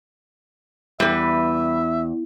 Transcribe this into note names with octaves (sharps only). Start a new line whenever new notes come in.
E2 G3 B4 E5